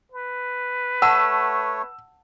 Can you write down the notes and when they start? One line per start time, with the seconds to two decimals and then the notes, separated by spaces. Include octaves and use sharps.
0.12 B4
1.02 A3 C#5 F#5 A5 E6